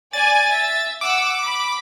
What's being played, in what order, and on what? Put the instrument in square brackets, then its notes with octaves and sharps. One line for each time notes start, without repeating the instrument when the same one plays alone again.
[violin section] D5 G#5 [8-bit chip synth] A6
[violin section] E5
[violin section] F#5 E6 [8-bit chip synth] D6
[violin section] B5